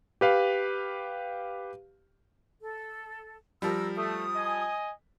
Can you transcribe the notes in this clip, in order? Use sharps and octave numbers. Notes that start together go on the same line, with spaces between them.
G4 B4 F5
A4
F3 G3 A#4 E6
A3 D#6
D#5 G#5